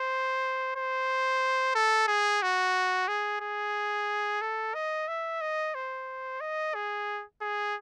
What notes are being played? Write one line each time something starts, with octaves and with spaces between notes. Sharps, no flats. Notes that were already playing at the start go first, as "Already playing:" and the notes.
Already playing: C5
C5
A4
G#4
F#4
G#4
G#4
A4
D#5
E5
D#5
C5
D#5
G#4
G#4